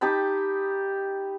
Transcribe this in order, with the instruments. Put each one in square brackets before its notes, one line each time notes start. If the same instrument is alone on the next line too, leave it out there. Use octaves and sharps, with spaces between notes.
[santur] D#4 G4 A5 B5